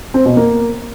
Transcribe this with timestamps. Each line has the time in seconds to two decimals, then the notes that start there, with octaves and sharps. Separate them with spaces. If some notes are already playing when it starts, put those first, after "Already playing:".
0.14 C4
0.25 B2
0.37 A#3